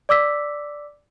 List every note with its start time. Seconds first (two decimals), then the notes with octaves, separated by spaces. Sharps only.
0.09 D5 D6 E6 B6